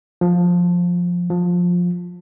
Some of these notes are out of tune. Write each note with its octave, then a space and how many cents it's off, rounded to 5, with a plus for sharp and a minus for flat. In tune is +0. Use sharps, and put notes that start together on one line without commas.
F3 +10
F3 +15